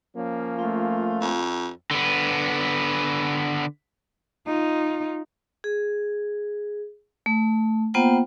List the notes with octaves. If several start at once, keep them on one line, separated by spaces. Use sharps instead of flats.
F3 A#3 C#4
A3 F4
F2
D3 B3
D#4 F4
G#4
A3
A#3 B3 F4 C5 F#5 G5